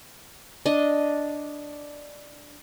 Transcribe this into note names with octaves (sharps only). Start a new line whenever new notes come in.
D4 D#5